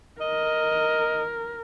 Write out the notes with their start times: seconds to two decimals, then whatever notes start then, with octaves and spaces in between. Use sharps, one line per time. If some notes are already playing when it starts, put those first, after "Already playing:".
0.21 A#4 D#5